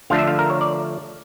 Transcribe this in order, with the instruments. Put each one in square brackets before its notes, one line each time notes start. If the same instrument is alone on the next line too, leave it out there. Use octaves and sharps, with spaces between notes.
[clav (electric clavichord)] D3 F3 A3 D4 F5
E5
F5
A#4
C#5
D5